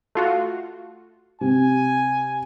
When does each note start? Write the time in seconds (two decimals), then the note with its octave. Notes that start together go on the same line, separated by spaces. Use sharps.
0.15 A3 F4 F#4
1.41 C3 G#5